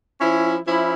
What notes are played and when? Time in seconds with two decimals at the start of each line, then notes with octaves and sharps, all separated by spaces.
0.19 F3 C#4 E4
0.66 F3 C#4 E4